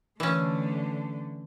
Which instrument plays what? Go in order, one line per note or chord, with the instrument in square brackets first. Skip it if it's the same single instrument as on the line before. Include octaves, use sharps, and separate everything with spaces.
[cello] D3 A3 [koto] E3 C#4